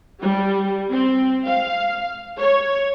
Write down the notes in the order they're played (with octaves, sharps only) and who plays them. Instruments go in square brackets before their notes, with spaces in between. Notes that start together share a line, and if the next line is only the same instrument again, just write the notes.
[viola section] G3
C4
F5
C#5